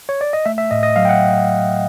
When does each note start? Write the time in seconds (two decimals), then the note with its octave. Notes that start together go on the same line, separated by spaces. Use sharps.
0.09 C#5
0.21 D5
0.33 D#5
0.46 A3 E5
0.58 E5
0.71 A2 D#5
0.83 D#5
0.96 F#3 F5
1.05 G5
1.09 F#5